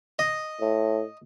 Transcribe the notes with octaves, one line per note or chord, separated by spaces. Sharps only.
D#5
A2